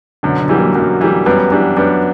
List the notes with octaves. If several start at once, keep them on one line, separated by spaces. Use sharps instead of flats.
F#2 B2 D3
D3 F#3
E3 G3
F#3 A#3
F#2 F#3 A#3
E3 G3
F#2 G3 B3
E3 G3 B3 D4
F#2 B3 D4